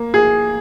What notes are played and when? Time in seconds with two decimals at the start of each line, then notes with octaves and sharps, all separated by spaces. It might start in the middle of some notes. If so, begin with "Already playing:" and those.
Already playing: A#3
0.14 G#4